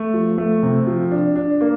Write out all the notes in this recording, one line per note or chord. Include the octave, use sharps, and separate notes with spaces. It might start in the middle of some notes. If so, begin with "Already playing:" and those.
Already playing: A3
F3
A3
C3
F3
D4
D4
A#3